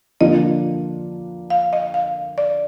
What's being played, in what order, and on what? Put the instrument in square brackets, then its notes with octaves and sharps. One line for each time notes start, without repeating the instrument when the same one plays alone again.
[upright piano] D3 F3 A#3 D4 F4 [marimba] D#5
[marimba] F5
D#5
F5
D5